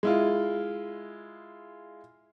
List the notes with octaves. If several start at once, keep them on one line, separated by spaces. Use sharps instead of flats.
G#3 E4 F4